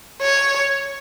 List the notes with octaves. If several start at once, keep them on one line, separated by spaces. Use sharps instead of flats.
C#5